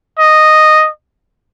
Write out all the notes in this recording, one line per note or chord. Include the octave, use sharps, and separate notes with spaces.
D#5